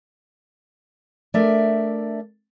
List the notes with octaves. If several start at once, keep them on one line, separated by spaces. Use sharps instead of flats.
A3 D4 A#4 D5 E5